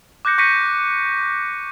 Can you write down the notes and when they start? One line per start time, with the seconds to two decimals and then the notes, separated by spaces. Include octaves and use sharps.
0.25 D6 F#6 G6 A#6 C#7
0.38 C#6 G6 A#6 B6 C#7 D#7